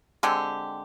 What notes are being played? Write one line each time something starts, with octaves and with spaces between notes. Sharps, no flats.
D3 G#3 C4 G4